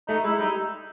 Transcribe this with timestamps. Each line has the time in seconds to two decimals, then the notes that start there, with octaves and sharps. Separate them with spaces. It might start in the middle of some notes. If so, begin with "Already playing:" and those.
0.08 A3 D#4
0.24 G#3 E4
0.39 G3 D#4